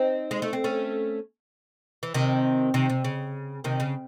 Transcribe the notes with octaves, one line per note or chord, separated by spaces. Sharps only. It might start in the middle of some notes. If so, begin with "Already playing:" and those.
Already playing: C4 D#4
G#3
A3
C4
A3 C#4
E3
C3 D#3
C3 D#3
C3
C#3
C3 D#3
C#3